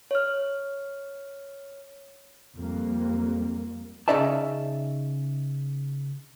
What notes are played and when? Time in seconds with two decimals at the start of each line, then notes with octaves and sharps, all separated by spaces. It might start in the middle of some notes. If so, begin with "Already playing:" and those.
0.11 C#5 F6
2.56 F2 G3 A#3
4.08 C#3 C#4 D#4 D5 E5 A5